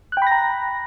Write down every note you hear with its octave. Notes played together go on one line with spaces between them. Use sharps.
G5 A#5 B5 F#6 A#6